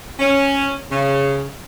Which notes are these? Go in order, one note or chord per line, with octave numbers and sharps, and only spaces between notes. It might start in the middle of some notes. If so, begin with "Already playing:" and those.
C#4
C#3